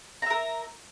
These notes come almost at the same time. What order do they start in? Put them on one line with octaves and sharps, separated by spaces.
A#5 E5 A#4